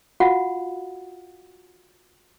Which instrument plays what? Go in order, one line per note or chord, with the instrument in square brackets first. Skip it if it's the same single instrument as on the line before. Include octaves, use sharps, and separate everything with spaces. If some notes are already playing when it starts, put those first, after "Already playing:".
[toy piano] F4 F#4 F5 F#5